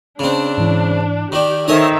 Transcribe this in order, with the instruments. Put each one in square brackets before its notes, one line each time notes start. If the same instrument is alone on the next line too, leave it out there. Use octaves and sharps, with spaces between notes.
[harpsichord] C#3 C4 [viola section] D4
[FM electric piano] G#2 E3
[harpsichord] D#3 D4 [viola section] G4
[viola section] D#3 E5 [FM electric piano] D#4 A4 C5 [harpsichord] C#5 D#5 G#5